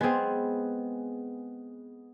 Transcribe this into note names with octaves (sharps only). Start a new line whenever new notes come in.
G#3 B3 C4 G#4